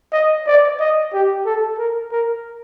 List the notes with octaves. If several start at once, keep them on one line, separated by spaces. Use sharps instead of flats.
D#5
D5
D#5
G4
A4
A#4
A#4